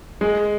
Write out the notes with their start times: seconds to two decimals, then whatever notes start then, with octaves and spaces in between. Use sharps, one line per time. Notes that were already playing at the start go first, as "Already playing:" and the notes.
0.21 G#3